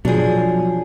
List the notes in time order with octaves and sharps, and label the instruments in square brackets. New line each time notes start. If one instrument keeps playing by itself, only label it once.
[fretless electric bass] B2 [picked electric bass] F3 F#3 [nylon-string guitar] D4 G#4